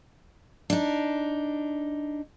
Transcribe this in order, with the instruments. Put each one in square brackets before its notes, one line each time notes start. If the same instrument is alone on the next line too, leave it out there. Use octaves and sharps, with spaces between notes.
[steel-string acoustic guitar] D4 D#4